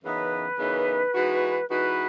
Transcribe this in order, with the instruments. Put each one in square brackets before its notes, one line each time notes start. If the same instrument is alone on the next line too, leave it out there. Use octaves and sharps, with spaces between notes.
[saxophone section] F#2 C#3 E3 B3 D#4 [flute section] B4
[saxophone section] F#2 C#3 E3 B3 D#4
E3 G#3 D#4 F#4
[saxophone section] E3 G#3 D#4 F#4 [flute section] B4